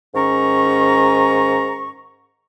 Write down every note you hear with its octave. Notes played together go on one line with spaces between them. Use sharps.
G#2 D#3 C#4 A#5 C#6